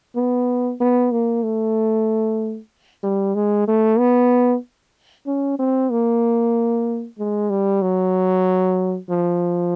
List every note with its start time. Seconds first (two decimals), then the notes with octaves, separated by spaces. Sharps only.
0.16 B3
0.81 B3
1.11 A#3
1.43 A3
3.03 G3
3.35 G#3
3.67 A3
3.99 B3
5.27 C#4
5.59 C4
5.91 A#3
7.18 G#3
7.50 G3
7.82 F#3
9.10 F3